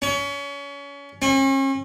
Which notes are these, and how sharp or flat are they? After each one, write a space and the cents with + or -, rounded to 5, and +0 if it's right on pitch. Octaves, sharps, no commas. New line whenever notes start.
C#4 +30
C#4 -40